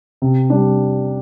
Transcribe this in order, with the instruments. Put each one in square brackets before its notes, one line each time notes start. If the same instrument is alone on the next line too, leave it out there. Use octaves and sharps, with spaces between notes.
[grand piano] C3
G3 D4